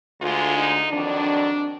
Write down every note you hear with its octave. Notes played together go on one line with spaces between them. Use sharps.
D2 D3 G#3 F4
D#4
F2 D#3 F#3 D4